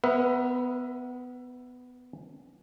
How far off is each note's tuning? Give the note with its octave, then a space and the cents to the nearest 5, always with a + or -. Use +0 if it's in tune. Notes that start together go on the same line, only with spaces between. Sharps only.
B3 +15 B4 -35 E5 +20